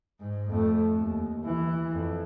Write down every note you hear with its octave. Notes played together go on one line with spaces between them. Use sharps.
G#2
F2 A3
D#2
E3
F2